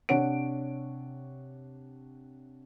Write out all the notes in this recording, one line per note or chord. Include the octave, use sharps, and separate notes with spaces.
C3 D4 C#5 F#5 D7